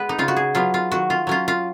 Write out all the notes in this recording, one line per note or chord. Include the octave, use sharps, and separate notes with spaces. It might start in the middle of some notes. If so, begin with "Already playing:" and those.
Already playing: G#3 B3 B4
D#4
C#3 F4
F#4
G#4
F#3 B3 F4
F4
D#3 F#4
F4
F#3 C#4 F4
F4